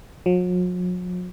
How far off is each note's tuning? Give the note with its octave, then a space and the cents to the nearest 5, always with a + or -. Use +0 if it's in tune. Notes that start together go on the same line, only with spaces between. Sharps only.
F#3 -45